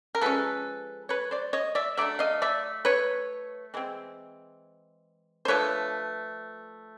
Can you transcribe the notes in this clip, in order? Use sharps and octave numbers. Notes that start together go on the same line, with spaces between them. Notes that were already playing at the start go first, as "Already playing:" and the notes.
A#4
F3 G#3 C#4 A4 B4
B4 C#5
C5 D5
C#5 D#5
D5 E5
F#3 A3 D4 D5 E5
D#5 F5
D5 E5
B4 C#5
E3 G#3 C4
C5
F3 A3 D4 B4 C#5